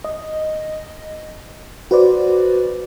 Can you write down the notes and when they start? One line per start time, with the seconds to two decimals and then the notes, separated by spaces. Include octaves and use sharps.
0.04 D#5
1.91 F#4 B4 C5 D5